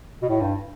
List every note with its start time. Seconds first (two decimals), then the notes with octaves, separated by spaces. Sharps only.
0.22 B2
0.29 A2
0.41 G2